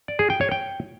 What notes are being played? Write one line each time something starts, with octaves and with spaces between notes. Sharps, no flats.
D5
G#4
G5
C#5
G5